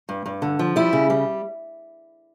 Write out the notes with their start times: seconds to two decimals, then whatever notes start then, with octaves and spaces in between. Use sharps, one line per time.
0.09 G2
0.26 G2
0.42 D3
0.59 F3
0.76 G3 E4
0.93 C#3
1.10 G3